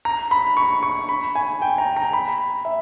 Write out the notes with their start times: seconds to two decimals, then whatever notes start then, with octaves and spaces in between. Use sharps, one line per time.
0.05 A#5
0.31 B5
0.57 C#6
0.83 C#6
1.09 B5
1.35 G#5
1.62 G5
1.78 A#5
1.97 A#5
2.13 B5
2.65 E5